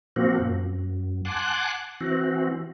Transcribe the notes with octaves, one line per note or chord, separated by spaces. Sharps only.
A#2 F3 A#3 C4 F#4
F#2
F#5 G#5 A5 C6 D6 F#6
E3 C4 F#4